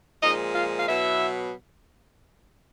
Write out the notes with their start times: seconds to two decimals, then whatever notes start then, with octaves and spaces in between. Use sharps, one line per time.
0.22 A#2 F3 G#3 D#4 D#5
0.54 F4 F5
0.78 F5
0.87 B2 F#3 B3 E4 E5